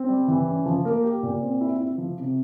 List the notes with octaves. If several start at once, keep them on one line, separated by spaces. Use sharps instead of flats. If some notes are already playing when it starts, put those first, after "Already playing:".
Already playing: C4
G3
E3
C#4
F3
A#3
G4
A#2
C4
E4
E4
F3
C3